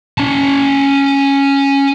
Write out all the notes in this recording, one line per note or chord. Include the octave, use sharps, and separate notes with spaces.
C#4 A5